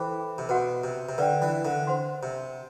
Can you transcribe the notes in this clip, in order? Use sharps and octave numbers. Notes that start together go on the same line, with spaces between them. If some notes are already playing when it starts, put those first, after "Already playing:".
Already playing: E3 A4 C5 G5 B5 D6
C3
B2 B4 F#5 C6
C3
C3
D3 B4 D5 G5
E3
D3
C5 F#5 C6
C3